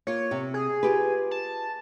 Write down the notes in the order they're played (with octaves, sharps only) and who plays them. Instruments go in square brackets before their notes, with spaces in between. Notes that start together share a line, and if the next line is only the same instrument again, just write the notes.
[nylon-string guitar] A#3 F4 [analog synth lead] C#5
[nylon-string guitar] C3
[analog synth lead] G#4
[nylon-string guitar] F4 G4 B4
[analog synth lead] A5